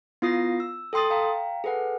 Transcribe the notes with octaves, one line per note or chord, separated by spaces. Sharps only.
B3 E4 F4 D#6 A#6 C7
E6
A4 G5 C6 D#6 A6
F5 G5 A#5
G#4 A4 B4 F#5